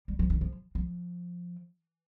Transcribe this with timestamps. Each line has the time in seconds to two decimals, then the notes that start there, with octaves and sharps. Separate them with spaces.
0.08 G3
0.19 F3
0.30 D#3
0.41 F3
0.75 F3